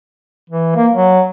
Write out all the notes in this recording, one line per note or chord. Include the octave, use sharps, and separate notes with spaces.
E3
A#3
F#3